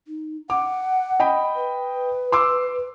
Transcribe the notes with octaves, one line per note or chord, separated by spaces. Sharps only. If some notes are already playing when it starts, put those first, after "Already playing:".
D#4
F#5 D6
D#5 G5 B5
B4
C6 D6 E6